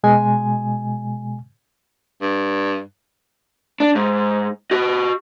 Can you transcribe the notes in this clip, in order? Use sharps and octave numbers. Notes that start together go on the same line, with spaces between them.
B2 G#3 G#5
G2
D4
G#2
F#4 D#5